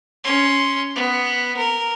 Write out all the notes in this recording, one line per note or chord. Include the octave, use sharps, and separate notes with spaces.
C#4 C6
B3
A#4